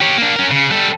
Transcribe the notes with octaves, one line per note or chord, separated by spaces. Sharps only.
G4 C#5
A#3 D4
C#4 A#4
C#3
G3 A4